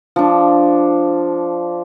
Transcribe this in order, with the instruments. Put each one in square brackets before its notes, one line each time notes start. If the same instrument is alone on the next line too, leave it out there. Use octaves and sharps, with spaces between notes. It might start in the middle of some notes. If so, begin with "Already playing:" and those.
[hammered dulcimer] F3 D4